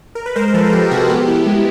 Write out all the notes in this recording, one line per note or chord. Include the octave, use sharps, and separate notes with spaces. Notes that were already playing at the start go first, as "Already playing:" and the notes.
A#4
B4
G#3 A#4 C5
A#4
F3 A4 B4
A#4
F3 G4 A4
C3 F#4 G#4
B3 G4
E4
G#3